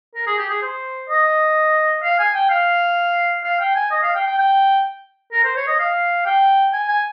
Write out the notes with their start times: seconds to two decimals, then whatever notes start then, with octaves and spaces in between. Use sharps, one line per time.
0.15 A#4
0.27 G#4
0.38 G4
0.50 G#4
0.62 C5
1.09 D#5
2.03 F5
2.19 G#5
2.34 G5
2.50 F5
3.44 F5
3.60 G5
3.75 G#5
3.91 D#5
4.03 F5
4.15 G5
4.27 G5
4.38 G5
5.32 A#4
5.44 C5
5.57 C#5
5.67 D#5
5.80 F5
6.26 G5
6.73 G#5
6.89 G#5